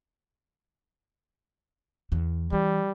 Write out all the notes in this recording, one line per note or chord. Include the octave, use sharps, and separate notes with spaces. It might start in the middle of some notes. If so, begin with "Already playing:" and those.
E2 E3
E3 G3